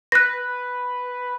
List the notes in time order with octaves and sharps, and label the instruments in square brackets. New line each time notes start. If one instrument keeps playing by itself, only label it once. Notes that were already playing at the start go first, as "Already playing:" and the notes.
[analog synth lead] B4 [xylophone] F#6 A#6